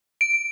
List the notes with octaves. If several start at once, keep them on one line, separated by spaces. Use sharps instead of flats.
D7